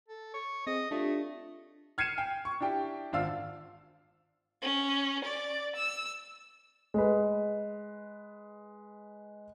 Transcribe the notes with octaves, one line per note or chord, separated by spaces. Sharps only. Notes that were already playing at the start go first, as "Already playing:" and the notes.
A4
C#5
C4 G#4 D#5
A3 D4 F4 G4
F6 G#6 C7 C#7 D#7 E7
G5
C#6
D4 E4 G4 G5
G#1 D4 F4 F5 E6
C#4
D5
E6
G#3 B4